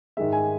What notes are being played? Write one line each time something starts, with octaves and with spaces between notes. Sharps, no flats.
G#2 D#3 G#3 E5
G#5